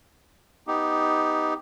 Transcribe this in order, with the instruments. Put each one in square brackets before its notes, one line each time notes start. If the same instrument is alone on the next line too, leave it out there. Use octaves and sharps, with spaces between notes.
[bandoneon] B3 D#4 G4